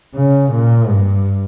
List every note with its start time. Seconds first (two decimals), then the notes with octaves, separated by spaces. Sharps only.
0.15 C#3
0.52 A#2
0.90 G2